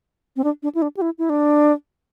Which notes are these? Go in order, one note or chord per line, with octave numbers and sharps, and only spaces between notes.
C4
D4
D4
E4
D4
G4
E4
E4
D4